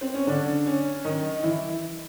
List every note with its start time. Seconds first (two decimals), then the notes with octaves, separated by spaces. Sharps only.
0.01 C4
0.14 C#4
0.27 D3 D4
0.66 C#4
1.05 D#3 D#4
1.43 E3 E4